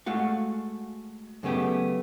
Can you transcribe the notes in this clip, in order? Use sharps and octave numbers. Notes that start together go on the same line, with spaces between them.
G#3 A3 F#4 F5
F#2 C#3 A3 B3 G4